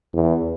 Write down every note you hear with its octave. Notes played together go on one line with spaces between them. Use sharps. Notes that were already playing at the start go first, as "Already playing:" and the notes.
E2